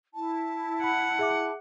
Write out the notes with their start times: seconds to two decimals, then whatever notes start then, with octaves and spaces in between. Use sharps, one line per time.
0.14 E4 A5
0.84 F#5 B5
1.19 G#4 E5 D6